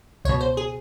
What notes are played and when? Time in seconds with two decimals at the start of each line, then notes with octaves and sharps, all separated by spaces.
0.25 C#2 C#5
0.29 B2
0.41 C5
0.57 G#4